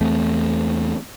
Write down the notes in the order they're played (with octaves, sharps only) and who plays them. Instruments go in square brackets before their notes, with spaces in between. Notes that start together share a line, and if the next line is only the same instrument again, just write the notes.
[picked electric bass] E2 A3 C4